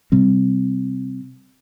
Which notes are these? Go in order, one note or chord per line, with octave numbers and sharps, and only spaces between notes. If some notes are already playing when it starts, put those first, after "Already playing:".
C3 G3 C4